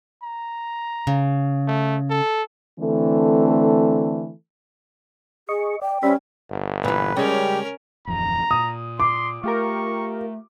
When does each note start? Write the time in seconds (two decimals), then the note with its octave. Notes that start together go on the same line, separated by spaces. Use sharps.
0.23 A#5
1.07 C#3
1.68 A3
2.10 A4
2.80 D3 E3 A3 C4 A4
5.49 G#4 D#5 C#6
5.82 D5 G5
6.03 G3 C#4 C5 E5 B5
6.50 G1
6.84 A#2 E3 B4
7.17 C#3 G3 G#3 C#4 G4 A#4
8.07 D1 F2 E3 A#5
8.51 A#2 D#6
9.00 C6 D6
9.44 A3 F4 G4 A#4 C#6